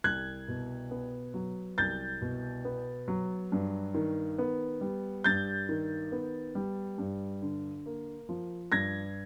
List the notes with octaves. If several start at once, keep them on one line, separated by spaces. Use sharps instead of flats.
C2 F#6 G#6
B2
B3
F#3
C2 G6 A6
B2
B3
F#3
G2
D#3
B3
G3
G2 G6 A6
D#3
B3
G3
G2
D3
A#3
F3
G2 G#6 A#6